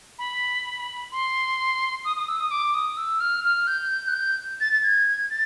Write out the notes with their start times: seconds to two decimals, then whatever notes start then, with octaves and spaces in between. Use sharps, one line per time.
0.18 B5
1.11 C6
2.04 D#6
2.16 D#6
2.28 E6
2.39 D#6
2.51 D6
2.74 D#6
2.97 E6
3.20 F6
3.44 F6
3.67 G6
3.91 G6
4.08 F#6
4.14 G6
4.60 A6
4.72 A6
4.83 G#6
5.30 A6